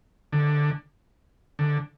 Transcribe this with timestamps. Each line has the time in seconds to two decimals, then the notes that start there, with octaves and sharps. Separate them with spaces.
0.32 D3
1.59 D3